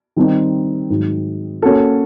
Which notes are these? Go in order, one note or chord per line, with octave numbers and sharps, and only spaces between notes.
D#3 G3 C4 D#4
G#2 D#3 F#3
A#3 C#4 F#4 A4